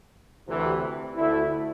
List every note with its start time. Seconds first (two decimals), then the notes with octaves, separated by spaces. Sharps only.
0.48 D2 C3 E3
1.16 D2 D3 A3 E4